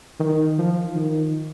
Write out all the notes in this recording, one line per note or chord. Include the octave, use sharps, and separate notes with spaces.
D#3
F3
D#3